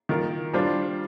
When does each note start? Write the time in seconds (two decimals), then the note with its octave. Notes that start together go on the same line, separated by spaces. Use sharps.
0.09 D#3 A#3 F4 A#4
0.53 G3 D4 F4 C5